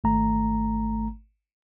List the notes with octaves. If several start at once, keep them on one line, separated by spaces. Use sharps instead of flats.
G#1 A3 A#5